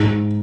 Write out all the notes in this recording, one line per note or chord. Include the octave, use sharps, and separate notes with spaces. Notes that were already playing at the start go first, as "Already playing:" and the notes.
Already playing: G#2